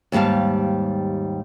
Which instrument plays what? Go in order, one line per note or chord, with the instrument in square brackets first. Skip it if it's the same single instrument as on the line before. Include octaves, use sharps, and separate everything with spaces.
[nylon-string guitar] D#2 G#2 G3 F5 A5